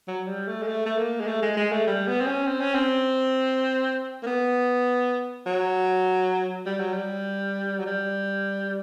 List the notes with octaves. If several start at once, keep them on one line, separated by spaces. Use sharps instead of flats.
F#3
G3
A3
G#3
A3
A3
A#3
G#3
A3
G#3
G#3
A3
G3
B3
C4
C#4
C4
C#4
C4
A#3
B3
F#3
G3
F#3
G3
F#3
G3